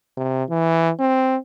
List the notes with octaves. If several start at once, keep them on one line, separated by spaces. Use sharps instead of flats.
C3
E3
C4